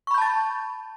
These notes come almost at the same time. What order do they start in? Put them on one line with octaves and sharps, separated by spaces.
C#6 B5 G6 A5 A6